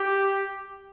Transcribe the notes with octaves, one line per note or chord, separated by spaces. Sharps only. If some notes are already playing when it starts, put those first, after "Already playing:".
Already playing: G4